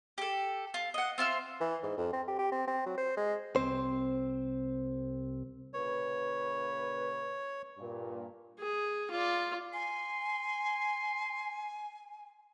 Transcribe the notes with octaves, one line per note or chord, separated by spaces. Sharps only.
G4 A4
F4
D#5 F#5
C4 F4 E5 F6
E3
G#2
F2
C4
G4
G4
C4
C4
F#3
C5
G#3
C2 C4 C5
A#2 C#3 B4 C#5
G2 A#2
G#4
F4 D5
G#5 C6